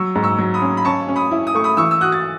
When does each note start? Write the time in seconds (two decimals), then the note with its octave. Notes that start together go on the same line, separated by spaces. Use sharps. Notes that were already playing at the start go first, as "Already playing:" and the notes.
Already playing: F#3 C#6 E6
0.15 G#2
0.23 C#6 E6
0.38 F#3
0.54 B5 D#6
0.62 C#4
0.77 B5
0.85 C#4 A5 C#6
1.08 C#4
1.16 B5 D#6
1.31 E4
1.47 D#6
1.55 A3 C#6
1.64 B5 D#6
1.77 E3 C#6 E6
1.91 E6
2.01 F#4 D#6 F#6
2.12 A6